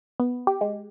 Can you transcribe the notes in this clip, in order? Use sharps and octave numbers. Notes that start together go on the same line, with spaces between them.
B3
G4
G#3